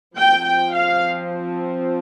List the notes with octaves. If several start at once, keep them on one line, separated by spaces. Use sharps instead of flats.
F3 C4 G5
G5
F5